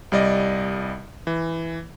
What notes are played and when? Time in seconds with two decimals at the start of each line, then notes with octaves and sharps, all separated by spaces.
0.12 C2 G3 D5 D#5
1.27 E3